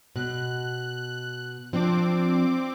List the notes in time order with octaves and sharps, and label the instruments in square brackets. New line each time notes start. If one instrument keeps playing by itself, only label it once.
[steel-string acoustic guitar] B2 [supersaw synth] F#6
[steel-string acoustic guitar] F3 D4 [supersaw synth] C4 D6